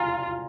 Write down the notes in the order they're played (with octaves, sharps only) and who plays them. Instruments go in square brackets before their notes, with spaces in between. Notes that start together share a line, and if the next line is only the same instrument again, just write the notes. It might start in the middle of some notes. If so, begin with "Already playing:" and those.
Already playing: [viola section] F4 [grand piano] G#5 A#5